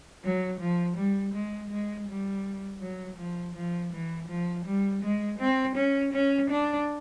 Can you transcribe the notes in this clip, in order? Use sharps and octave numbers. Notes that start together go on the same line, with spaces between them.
F#3
F3
G3
G#3
G#3
G3
F#3
F3
F3
E3
F3
G3
G#3
C4
C#4
C#4
D4